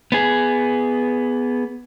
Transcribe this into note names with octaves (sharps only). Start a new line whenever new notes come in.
B3 G#4